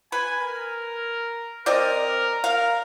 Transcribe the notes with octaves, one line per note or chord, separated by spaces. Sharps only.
B4 G#5
A#4
C4 A#4 D5 D#5
A#4 F5